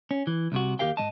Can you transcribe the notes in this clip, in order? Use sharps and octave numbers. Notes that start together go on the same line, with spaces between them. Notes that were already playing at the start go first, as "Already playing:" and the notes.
C#4
E3
C2 C3 F#4
D#2 E3 G4 A#4 F5 G5
G#2 F#3 D#5 A5